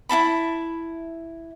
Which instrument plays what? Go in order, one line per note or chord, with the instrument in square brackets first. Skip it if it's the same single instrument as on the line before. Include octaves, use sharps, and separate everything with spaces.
[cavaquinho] E4 F4 A5 B5